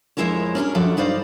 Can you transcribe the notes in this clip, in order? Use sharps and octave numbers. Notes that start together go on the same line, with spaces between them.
F2 B2 G#3 E4 A#4 C#5
C#4 D4 A4 A#4
F#2 F3 F#4 A4 D5 F#5
G2 D#4 C5 D5 F5